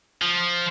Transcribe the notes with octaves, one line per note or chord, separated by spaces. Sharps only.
F3